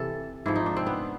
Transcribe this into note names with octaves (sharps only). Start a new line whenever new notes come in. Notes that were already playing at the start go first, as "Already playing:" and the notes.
Already playing: C3 E3 A4
G#2 F3 E4
D#4
D4
C4
B3